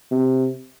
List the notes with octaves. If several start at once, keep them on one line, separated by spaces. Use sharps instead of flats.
C3